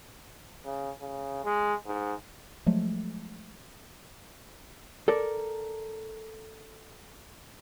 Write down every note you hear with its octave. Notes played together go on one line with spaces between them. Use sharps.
C#3
C#3
G#3
G#2
F3 F#3 G#3 A3
A4 A#4 D5